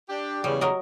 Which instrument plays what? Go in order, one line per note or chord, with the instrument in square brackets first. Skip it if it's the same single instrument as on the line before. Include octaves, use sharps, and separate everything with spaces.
[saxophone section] D4 G4
[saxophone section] E2 C#3 [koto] G3
[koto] F#3 A#4 D#5